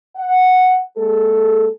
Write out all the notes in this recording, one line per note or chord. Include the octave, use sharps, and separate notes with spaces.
F#5
G#3 A#3 G#4 A4